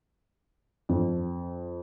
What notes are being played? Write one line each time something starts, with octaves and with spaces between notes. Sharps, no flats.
F2